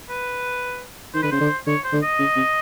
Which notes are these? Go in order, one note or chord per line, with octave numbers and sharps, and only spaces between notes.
B4
D#3 C5
D3 B4
C#3 C5
D3
D3 C#5
C5
D3
D#5
C#3
C3